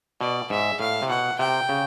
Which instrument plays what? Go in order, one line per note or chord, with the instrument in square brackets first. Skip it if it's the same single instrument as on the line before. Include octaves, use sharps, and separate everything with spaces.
[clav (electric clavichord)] B2 [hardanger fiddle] D5
[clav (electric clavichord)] G#2 [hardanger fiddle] E5
[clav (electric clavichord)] A2 [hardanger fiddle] F5
[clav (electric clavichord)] C3
[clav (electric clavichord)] B2 [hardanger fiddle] F#5
[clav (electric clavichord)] C3 [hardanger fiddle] G5
[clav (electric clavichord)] C#3